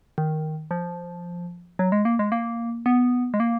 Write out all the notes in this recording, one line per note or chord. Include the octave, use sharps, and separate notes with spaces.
D#3
F3
F#3
G#3
A#3
G#3
A#3
B3
G#3
A#3